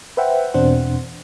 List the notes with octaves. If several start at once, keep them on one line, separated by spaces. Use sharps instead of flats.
B4 C5 E5 F#5 G5
E2 B2 C4 D4 C5 F#5